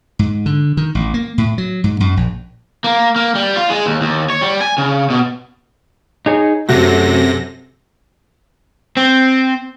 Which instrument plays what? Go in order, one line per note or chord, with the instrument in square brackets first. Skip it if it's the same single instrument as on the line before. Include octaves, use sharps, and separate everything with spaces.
[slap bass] G#2
D3
D#3
A1
A#3
A2
F#3
G#2
F#2
A#1
[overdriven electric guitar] A#3
A#3
G3
F4
G#3
D#2
D#2
C#5
G3
G#5
C#3
B2
[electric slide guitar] D#4 G#4 C#5
[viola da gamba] F#2 A4 [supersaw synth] C3 A#6 [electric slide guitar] A3 F#4
[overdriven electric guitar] C4